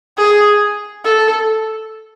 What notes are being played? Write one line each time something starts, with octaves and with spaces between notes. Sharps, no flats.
G#4
A4